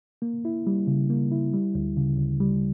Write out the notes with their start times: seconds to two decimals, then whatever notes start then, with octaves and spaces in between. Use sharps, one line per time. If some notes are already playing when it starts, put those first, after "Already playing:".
0.22 A#3
0.45 E4
0.67 G3
0.87 C#3
1.10 A#3
1.32 E4
1.53 G3
1.75 D2
1.97 C#3
2.18 D2
2.40 G3